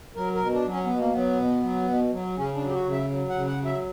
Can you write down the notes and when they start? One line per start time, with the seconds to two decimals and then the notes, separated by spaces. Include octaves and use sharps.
0.16 F#3 A#4
0.35 A#4
0.41 B2
0.54 D4
0.66 F#3
0.72 C#4
0.85 B2 B3
0.99 A#3
1.13 F#3 B3
1.38 B2
1.63 F#3
1.88 B2
2.13 F#3
2.37 C#3 C#4
2.55 D4
2.61 F#3
2.69 G4
2.74 F#4
2.86 C#3
2.92 E5
3.10 F#3
3.29 F#5
3.35 C#3
3.46 F#5
3.60 F#3
3.65 E5